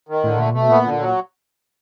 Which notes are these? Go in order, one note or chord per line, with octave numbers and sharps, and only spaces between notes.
D#3
A2 D3
A#2 A3
B2 A3
A#2 B3
D3
A#2
F#3